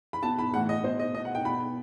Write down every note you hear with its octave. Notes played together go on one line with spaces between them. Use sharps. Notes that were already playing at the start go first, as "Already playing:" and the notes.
B5
B2 A5
B5
A2 E3 F#5
D#5
B2 C5
D#5
B2 D#5
F#5
G5
B2 B5